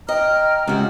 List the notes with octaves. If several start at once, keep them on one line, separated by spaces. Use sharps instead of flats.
D#5 G5 A#5 F6
C#2 C3 F#4